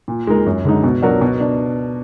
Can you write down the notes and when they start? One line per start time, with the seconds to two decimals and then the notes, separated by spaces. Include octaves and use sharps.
0.08 A#2
0.27 G#3 D#4 A#4
0.46 F#2
0.65 D3 G#3 D#4
0.84 B2
1.02 F#3 D4 F#4 A#4
1.21 B2
1.40 D4